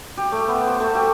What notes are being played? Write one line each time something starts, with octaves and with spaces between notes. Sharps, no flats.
G4
A3
B3
C5
A3
G4